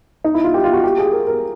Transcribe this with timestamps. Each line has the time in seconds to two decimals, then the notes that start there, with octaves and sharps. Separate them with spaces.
0.24 D#4
0.34 E4
0.44 F4
0.54 G4
0.64 F4
0.73 F#4
0.84 G4
0.98 G#4
1.12 A#4
1.27 A#4